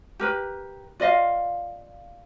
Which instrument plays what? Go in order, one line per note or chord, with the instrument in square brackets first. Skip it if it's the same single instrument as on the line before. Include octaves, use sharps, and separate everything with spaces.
[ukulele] G4 A#4 B4
F4 D5 D#5 F5